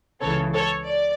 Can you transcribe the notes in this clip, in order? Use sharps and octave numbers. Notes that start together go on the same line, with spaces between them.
C#2 C#3 E3 A4 C#5
A4 C#5
D5